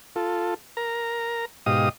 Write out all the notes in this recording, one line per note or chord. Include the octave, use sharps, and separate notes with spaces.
F4 A4
A#4 A#5
G#2 B2 G4 D#5 F5 D#6